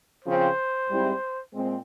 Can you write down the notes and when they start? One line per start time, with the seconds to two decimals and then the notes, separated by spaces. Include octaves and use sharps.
0.24 C#3 F3 C4 C5
0.89 G#2 G3 C4 E4 G4
1.54 A#2 G#3 C4